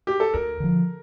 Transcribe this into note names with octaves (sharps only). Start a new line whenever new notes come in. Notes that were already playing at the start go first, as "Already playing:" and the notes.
G4
A4
D2 A#4
D3 F3